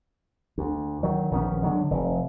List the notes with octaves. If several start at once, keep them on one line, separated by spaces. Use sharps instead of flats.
D2
D#3 F#3
A#1 D#3 B3 C#4
D3 F#3 G#3
F1